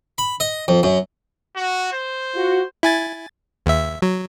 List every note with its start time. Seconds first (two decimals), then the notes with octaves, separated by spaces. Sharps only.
0.18 B5
0.40 D#5
0.68 F2
0.83 F#2
1.56 F#4
1.93 C5
2.35 F4 F#4
2.83 E4 G#5 A6
3.66 D#2 E5
4.02 F#3